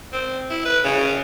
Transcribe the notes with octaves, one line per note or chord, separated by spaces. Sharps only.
C4
E4
B4
C#3